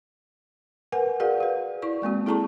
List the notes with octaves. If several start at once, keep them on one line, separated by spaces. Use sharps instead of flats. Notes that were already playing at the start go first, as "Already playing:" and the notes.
A#4 B4 F#5 G#5
F#4 G#4 A#4 D5 F5 F#5
F#4 B4
E4 D5 C#6
G#3 A#3 C4 F#4
E4 G#4 A4 A5 A#5 C#6